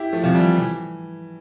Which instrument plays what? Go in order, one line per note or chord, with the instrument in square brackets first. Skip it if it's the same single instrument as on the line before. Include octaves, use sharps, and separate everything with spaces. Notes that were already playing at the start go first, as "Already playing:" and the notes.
Already playing: [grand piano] E4 G4
F3 A3
[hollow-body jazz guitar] C3 F3
[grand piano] E3 G3
E3